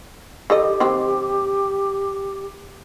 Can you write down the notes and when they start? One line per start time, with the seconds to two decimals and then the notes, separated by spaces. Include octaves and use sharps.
0.50 D#3 G4 A4 D#5
0.80 D#3 F#3 C4